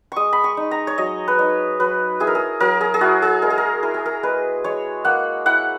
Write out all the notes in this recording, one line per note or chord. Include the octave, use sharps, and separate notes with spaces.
G#3 C#6 D#6
B5
C#6
D#4
A#5
C#5
F#3 D#5
B4
D#4 C#5
F#3 B4
E4 G#4
A#4
G#4
F#3 A#4
G#4
G#4
E4 F#4
G#4
G#3 A#4
G#4
A#4
E4 A#4
G#4
A#4
G#3 B4
G#3 C#5
A#3 F#5
E4 F#5